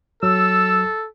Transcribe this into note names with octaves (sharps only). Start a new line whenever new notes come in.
F#3 A4 E6